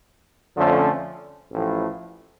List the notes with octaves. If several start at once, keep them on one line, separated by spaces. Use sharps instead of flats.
F2 D3 F3 A3 C#4
A1 A2 F3